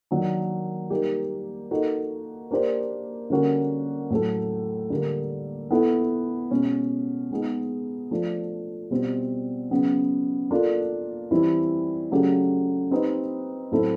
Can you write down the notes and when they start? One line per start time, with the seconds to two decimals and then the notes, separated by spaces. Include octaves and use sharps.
0.11 D#3 F#3 A#3 D4
0.90 G3 A#3 D#4 G4
1.71 A#3 D#4 F#4 A4
2.51 A#3 D4 G4 C5
3.30 D3 G3 A#3 C#4 F#4
4.10 A2 F#3 A3
4.90 D3 G3 A#3
5.71 B3 E4 A4
6.50 B2 G#3 C#4
7.31 G#3 B3 D#4 G#4
8.11 F3 A3 D4
8.91 B2 G3 C4
9.71 C#3 F#3 B3
10.51 A#3 D4 F4 A4
11.31 E3 G3 C4 E4
12.11 C#3 F#3 A3 D4 G4
12.91 C4 D#4 G4 B4 D#5
13.71 A2 F#3 A3 C4 E4